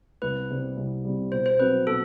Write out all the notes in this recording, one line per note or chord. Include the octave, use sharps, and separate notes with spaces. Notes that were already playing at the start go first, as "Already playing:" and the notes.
C2 B4
C3 G3
C2
C3 G3
B2 C5
C5
F#3 C4 B4
B2 A4